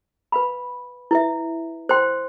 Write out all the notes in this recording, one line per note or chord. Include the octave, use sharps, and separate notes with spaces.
B4 F5 B5
E4 B4 E5
C5 G5 C6